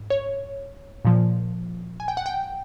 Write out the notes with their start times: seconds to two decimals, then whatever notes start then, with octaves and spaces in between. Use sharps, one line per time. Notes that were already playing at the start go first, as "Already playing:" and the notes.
Already playing: G#2
0.10 C#5
1.05 A#2 F3
2.00 G#5
2.08 G5
2.17 F#5
2.26 G5